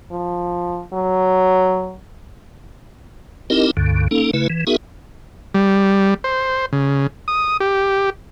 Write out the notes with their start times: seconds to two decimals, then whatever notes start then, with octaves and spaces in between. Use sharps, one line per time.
0.12 F3
0.93 F#3
3.50 C4 D#4 E4 G4 A#4 D#5
3.77 C#2 G2 D3
4.11 A#3 C#4 D#4 A4
4.33 C#3 A3 E4 B4
4.50 E3
4.67 B3 D#4 F#4 G#4 A#4 E5
5.54 G3
6.24 C5
6.73 C#3
7.28 D#6
7.60 G4